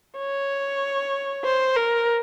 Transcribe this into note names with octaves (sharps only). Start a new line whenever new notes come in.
C#5
C5
A#4